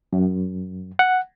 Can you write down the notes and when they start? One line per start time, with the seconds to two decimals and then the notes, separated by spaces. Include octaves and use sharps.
0.13 F#2
0.99 F#5